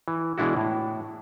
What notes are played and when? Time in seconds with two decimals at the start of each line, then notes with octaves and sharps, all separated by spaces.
0.08 E3
0.38 B2 E3 G#3 D4 E4 F#4
0.57 A2